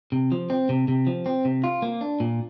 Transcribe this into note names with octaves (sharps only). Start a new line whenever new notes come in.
C3
F3
C4
C3
C3
F3
C4
C3
F4
A#3
D4
A#2